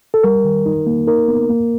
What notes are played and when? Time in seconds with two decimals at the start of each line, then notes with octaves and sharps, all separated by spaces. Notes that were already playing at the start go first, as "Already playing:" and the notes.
0.14 A4
0.23 G3 A#4
0.45 D#3
0.66 D#4
0.87 A#3
1.07 D#4 A#4
1.28 B3
1.50 A#3